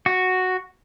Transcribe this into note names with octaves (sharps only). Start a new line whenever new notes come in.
F#4